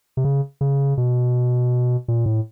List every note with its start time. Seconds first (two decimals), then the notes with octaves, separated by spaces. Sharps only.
0.17 C3
0.24 C#3
0.61 C#3
0.97 B2
2.08 A#2
2.26 A2